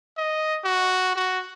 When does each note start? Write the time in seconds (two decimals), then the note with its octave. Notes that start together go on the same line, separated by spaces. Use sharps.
0.18 D#5
0.65 F#4
1.16 F#4